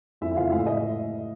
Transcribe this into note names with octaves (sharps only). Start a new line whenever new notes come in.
F2 E4 E5
E5
F#1 F4 F5
A2 F5
E5
D#5